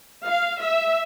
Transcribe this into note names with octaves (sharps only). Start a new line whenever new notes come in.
F5
E5